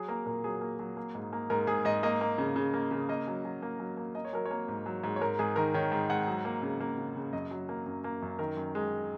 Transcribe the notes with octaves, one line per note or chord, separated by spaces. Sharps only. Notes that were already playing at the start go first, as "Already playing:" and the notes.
Already playing: F#3 G#4
A#3 A#4
A#2 A#4
F#3 G#4
A#3
F#3
A#3
G#2
A#3
G#2 A#4
G#2 G#4
G#2 D#5
A#3 D#5
A#3
C#3
C#3
A#3
C#3
A#3 D#5
F#3
F#3
A#3
F#3
A#3
A#3 D#5
C#5
F#3 A#4
C#5
A#3
G#2
F#3
G#2
C#5
G#2 A#4
G#2 G#4
D#3 A#4
D#3 C#5
G#2
G#2 F#5
F#3
A#3
C#3
A#3
C#3
C#3
F#2 D#5
F#3
A#3
F#2
A#3
F#2
D#3 A#4
F#2
G#3